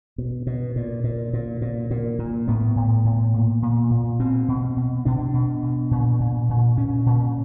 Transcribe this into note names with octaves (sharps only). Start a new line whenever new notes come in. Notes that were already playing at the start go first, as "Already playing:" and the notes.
B2
B2
A#2
A#2
A#2
A#2
A#2
A#2
A2 B3
A2
A2
A#2
A#2
A#2
B2 C4
B2
B2
B2 D4
B2
B2
A#2
A#2
A#2
A#2 C#4
A#2